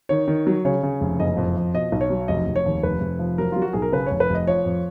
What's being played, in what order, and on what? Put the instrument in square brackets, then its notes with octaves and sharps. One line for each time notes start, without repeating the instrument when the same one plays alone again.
[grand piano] D#3 C#5
D#3
F#3
C#3 C#5
C#3
F1
F#1 D#5
F2
F3
B2 D#5
B1
C#5
F#3
F1 D#5
F1
C#5
D#2
F1 B4
F1
F3
F#3 A#4
F#3 F4
F#4
B1 G#4
A#4
C#3 B4
F1 C#5
B4
F1 D#5
F3 C#5
F2